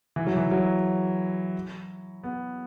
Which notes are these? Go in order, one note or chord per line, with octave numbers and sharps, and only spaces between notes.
E3
F#3
E3
F#3
B3